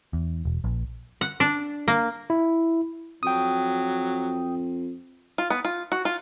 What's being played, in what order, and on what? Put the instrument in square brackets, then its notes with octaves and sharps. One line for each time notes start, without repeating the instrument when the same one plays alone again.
[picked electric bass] E2
E1
A#1
[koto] F#5
D4
A#3
[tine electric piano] E4
[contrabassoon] F2 [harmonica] F#3 [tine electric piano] G5 D#6
[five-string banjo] F4
B3
F4
F#4
F4